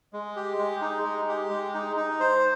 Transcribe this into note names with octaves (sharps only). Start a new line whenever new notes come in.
G#3
G4
G#3
D#4
G#3
G4
G#3
D#4
D#4
C5